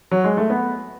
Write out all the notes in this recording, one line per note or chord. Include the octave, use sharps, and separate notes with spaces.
F#3
G#3
A3
B3